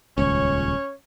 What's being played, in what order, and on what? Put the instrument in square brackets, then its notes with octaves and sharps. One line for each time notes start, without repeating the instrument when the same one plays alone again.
[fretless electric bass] D#1 C#2 [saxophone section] C#4 C#5